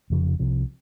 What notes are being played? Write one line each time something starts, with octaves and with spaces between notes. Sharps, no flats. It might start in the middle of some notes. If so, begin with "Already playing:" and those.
F1 F2 C#3 F3
C2 C3 F3